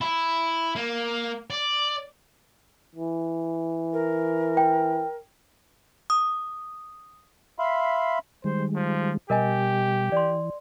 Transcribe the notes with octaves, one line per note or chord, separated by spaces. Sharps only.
E4
A#3
D5
E3
A#4
G5
D#6
E5 F5 B5 C6
D#3 G3 G#3 C5
F3
B2 G3 G4 A#4 D#5 G#5
E3 D5 C6